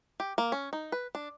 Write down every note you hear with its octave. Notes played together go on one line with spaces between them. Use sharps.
G4
A#3
C#4
D#4
B4
D4